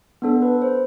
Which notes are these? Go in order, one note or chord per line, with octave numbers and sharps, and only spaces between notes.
B3 D4 A4
B4
C5